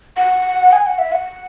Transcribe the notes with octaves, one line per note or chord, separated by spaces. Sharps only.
F#5
G#5
F#5
E5
F#5